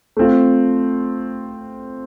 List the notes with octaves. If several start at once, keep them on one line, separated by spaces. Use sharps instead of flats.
A3 C4 F4